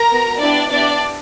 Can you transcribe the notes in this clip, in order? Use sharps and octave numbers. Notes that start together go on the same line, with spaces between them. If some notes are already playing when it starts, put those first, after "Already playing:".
Already playing: A#4 A#5
B3 F#4
B3 D4 E4 G4 D5
B3 D4 E4 G4 D5